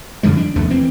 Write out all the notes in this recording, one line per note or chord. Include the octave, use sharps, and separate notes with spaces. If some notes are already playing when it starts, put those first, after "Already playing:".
F2 D3 F3 G#3
D4
F1 D#2 F3 A3
E3 C4